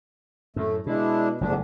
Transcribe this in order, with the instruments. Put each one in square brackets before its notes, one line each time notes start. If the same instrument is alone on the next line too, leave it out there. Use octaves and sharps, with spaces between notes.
[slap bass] F#2 A2 [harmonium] A3
[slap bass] B2 [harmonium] G#3 D4 E4
[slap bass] F#1 F3 A3 [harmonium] E2 G#2 D4